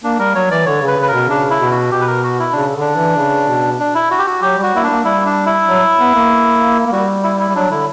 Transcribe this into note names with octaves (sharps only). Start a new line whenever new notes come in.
A#3 D4
G3 A#4
F#3 C#5
E3 D5
D3 C#5
C#3
B4
C#3 B4
A#4
B2
C#3 D4
E4
B2
F#4
B2 G4
B4
A#4
F#4
E4
C#3 D4
D3
D4
E3
C#3
B2
D4
E4
F#4
G4
F#4
F#3 G4
G3
F#4
A#3 E4
D4
A#3
G3 E4
D4
E4
F#3
B3
A#3
A#3
G3 F#4
E4
E4
G3
F#3 D4
D3 E4